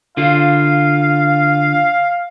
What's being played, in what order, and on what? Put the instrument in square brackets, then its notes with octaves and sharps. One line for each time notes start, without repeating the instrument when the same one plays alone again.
[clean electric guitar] D3 F4 [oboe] F5